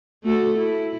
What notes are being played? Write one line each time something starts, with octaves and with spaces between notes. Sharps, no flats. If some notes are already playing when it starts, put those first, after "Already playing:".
A3 F#4 A4
E4